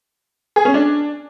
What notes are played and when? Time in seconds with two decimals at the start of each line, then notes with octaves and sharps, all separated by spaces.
0.56 G#4
0.65 C#4
0.74 D4